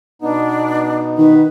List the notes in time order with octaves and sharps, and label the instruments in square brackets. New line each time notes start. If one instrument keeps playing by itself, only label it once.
[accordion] B2 B3 D#4 [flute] D4
[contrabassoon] D#3 [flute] B4